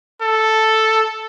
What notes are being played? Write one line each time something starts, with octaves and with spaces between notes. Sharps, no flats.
A4